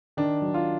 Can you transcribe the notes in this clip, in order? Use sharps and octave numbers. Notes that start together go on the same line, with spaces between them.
D#3 D4
F#3
F4